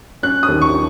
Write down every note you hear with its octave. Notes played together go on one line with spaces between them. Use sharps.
C#4 F#6
D#6
D#2
C#6